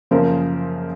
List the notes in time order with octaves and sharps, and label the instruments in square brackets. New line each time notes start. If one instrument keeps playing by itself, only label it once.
[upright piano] F#2 C#3 F3 A#3 A#4 C5